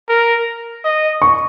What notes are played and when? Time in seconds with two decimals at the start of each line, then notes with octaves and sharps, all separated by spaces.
0.09 A#4
0.84 D#5
1.22 C#6